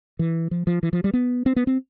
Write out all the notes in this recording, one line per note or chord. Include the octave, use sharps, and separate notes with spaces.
E3
F3
F3
E3
F3
G3
B3
C4
B3
C4